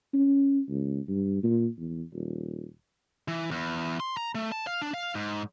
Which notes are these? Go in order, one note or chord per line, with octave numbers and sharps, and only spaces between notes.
C#4
C#2
G2
A#2
E2
D#1
E3
E2
C6
A#5
A3
A5
F5
D4
F5
G#2